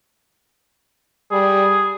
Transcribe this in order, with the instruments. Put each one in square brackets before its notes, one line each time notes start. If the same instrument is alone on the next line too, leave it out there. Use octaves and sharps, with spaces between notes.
[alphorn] G3 [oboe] G#4